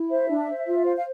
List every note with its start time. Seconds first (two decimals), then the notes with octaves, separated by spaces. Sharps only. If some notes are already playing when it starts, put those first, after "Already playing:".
Already playing: E4
0.10 C5 E5
0.29 D4
0.47 C5
0.66 F4
0.84 C5 F5
0.96 F5